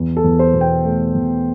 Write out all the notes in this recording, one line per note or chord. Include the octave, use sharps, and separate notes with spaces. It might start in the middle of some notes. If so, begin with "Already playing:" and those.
Already playing: E2
A4
E2
C5
B2
G5
A3
E2